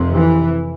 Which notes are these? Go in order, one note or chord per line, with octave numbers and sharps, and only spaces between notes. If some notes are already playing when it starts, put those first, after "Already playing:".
Already playing: F1 F2 C3
E3